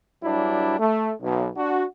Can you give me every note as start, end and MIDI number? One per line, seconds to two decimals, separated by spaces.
0.23 0.79 43
0.23 0.79 54
0.23 0.79 55
0.23 0.79 62
0.23 0.79 64
0.79 1.12 57
1.22 1.47 35
1.57 1.84 62
1.57 1.84 66